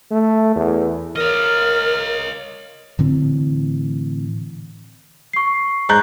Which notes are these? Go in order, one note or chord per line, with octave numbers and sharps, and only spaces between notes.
A3
E2
A#4 C#5 D#5 F6
A2 D3 E3 C4
C#6 C7
G#2 A#5 F#6 G6